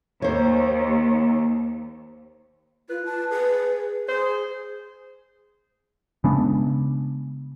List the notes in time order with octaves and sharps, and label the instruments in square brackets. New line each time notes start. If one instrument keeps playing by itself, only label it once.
[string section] D#2 [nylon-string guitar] C5 C#5
[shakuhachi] F4 [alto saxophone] B4
[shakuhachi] A5
[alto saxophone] G#4 [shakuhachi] B4
[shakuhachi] G#4 [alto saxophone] C5
[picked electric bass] C#3 G#3 B3 D4